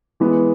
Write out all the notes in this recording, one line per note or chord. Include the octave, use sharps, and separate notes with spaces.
E3 G#3 B3